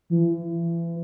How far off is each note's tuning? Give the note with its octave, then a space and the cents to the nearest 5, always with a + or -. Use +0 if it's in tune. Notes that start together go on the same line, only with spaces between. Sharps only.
E3 +35